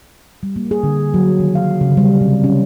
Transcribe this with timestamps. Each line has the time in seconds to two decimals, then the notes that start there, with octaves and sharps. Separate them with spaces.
0.43 G3
0.56 A#3
0.71 G#4
0.83 D3
1.14 F#3
1.40 D#3
1.55 F5
1.81 C#3
1.97 G3
2.21 C3
2.44 C#4